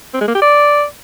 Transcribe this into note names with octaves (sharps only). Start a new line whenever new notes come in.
C4
G#3
A#3
G4
D5